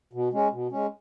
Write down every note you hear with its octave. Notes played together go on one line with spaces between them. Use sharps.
B2
G#3 C#4
B2
G#3 C#4